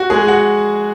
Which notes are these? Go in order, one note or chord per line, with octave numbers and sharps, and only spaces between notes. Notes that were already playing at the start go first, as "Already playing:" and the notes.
Already playing: F#4
G#3 G#4
F#4 F#5